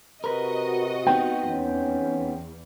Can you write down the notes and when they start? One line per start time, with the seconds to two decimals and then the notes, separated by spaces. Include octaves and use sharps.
0.24 C3 F#4 A#4 B4 D#5
1.07 B3 C4 D#4 G5
1.51 E2 C#4